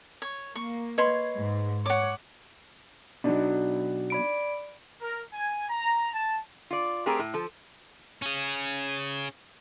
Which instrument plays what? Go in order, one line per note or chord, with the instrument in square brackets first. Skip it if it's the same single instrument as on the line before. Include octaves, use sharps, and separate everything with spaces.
[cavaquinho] C#5
[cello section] A#3 [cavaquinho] C#6
[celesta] B4 D#5 G#6 [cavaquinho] C#5 B5 C6
[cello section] G#2
[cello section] C#5 [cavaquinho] F#5 D6
[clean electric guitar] B2 F#3 [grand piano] D4 D#4
[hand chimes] D5 B5 D7
[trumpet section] A#4
G#5
A#5
A5
[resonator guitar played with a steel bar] F4 D5
A3 C4 G4 G#4 A#4
A2
F3 A4
[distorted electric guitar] C#4 G#4